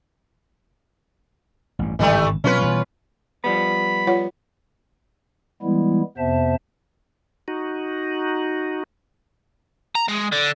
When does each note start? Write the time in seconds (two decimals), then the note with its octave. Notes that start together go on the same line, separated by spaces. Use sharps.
1.79 A1 G2
1.99 G#1 G2 C#3 E3 G3 A3
2.44 B2 F#3 C4 C#4 F4 B4
2.60 B2 E3 G3
3.44 F3 G3 B3 B5
4.07 F4 C#5 F#5
5.62 E3 G3 G#3 B3 E4
6.18 F2 C3 B3 C5 E5 A5
7.48 D#4 F#4
9.95 A#5
10.08 G#3
10.32 D3